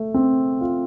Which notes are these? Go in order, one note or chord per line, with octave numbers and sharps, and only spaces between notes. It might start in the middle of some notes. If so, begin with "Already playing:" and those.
Already playing: A3
C4
F4